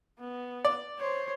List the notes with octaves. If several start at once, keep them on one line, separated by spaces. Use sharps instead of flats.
B3
D5
C5 C#5